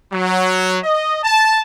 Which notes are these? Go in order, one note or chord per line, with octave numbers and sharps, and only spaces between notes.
F#3
D#5
A5